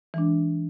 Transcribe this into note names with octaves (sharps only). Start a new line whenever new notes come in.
E3 G#3 D4